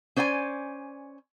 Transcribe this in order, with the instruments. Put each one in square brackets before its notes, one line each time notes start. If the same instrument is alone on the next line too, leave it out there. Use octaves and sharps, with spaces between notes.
[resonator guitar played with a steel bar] C#4 C5 D5 G5 G#5